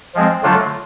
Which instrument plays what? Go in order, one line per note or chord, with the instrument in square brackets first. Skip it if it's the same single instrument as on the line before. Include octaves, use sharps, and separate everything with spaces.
[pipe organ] F3 G#3 C4
D3 F#3 A3 D4 F4